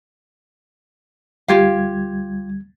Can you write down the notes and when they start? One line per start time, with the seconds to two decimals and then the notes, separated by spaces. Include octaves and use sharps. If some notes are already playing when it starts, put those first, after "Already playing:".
1.48 D2 G3 F4 G4 F5 G#6